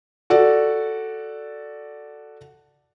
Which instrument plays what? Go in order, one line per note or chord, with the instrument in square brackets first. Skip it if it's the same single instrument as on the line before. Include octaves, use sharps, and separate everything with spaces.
[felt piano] F#4 A4 D5